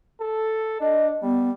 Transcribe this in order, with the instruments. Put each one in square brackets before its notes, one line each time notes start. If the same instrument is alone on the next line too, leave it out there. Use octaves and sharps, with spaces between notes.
[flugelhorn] A4
[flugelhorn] D4 [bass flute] D#5
[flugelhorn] G3 [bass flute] B3